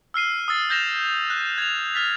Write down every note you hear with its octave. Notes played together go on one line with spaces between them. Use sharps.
E6 F6 C7 D#7
D#6 E6 A6 C7
F6 G6 A#6 E7 F7
F#6
G#6 F7
F6 A6 B6